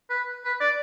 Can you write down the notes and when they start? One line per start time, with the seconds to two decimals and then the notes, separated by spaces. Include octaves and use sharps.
0.10 B4
0.45 B4
0.60 D5